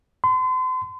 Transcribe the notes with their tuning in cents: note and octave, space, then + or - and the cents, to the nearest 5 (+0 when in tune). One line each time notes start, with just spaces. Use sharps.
C6 -40